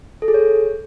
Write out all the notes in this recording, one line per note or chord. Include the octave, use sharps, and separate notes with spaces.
A4
G#4
C#5